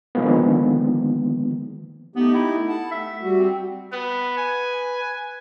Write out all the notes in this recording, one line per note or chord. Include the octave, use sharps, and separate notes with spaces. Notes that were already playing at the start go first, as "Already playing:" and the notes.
D3 D#3 F3 G#3 A#3 B3
A3 B3 D#4 G4
E4
F#5 A5
A3 E5
G3 F#4
C4
B3 B4
G#5